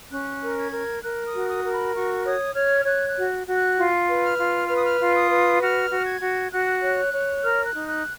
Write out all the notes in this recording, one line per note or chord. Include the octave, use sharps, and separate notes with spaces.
C#4 F#6
A#4
G#6
A#4
A#4 F#6
D#6
F#4
D#6
A#4
B5
F#4 C#6
C#5 D#6
C#5 F6
F6
C#5 F#6
F#6
F#4
F#4
F#6
F4
B4
F6
F4
B4 F6
D#6
F6
F4
D#6
B4
F#4 F6
F#4
G#6
F#4
F#4 F#6
C#5
C#5
A#4 F6
F#6
D#4
F#6